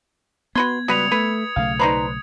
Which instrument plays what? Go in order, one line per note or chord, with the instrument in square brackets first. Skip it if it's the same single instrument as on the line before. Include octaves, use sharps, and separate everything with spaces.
[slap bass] B3 [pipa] F#4 B4 C6 [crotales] G#6
[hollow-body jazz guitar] C#2 G3 [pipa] F#4 B4 [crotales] D#6 C#7 F7
[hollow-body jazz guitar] A3 [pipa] B4 [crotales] G#6
[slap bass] B1 C#3 A3 [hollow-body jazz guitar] F5
[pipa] D#4 A#5 B5 [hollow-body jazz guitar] B4 C5 D5